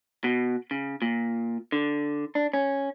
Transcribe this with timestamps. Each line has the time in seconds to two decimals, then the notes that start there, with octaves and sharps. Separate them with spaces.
0.24 B2
0.71 C#3
1.02 A#2
1.72 D3
2.35 D4
2.53 C#4